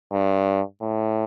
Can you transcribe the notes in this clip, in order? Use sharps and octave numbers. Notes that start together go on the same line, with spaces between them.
G2
A2